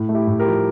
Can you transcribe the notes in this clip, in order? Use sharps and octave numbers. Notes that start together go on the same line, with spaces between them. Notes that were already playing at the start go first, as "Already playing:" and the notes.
Already playing: A2
A3
E4 G4
A2
G4 A#4
F3